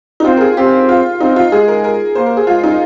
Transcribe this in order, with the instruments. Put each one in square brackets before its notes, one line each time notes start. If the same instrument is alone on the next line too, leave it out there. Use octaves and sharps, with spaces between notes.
[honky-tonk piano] D#4
[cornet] C4 [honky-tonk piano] F4
[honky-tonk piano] A#4
G#4
[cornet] C4 [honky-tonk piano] G4
[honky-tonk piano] F4
[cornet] C4 [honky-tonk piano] D#4
[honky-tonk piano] F4
[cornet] G#3 [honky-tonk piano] G#4
[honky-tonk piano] A#4
A#4
[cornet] A#3 [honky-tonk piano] C5
[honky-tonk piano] A#4
G#4
[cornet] G#3 [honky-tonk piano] F4
[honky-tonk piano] D#4